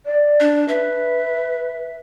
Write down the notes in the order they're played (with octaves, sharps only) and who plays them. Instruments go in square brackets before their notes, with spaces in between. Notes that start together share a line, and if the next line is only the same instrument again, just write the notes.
[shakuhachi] D5
[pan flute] D4
[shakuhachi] B4 [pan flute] E5